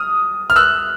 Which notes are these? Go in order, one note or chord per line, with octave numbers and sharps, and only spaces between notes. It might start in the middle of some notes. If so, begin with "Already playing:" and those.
Already playing: D#6 F6
F6
E6 F#6